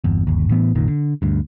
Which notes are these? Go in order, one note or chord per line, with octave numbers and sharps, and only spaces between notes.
G1 E2
G1 D#2
A2 E3 B3
F1 A#1 A#2 D#3
D3
D2 G2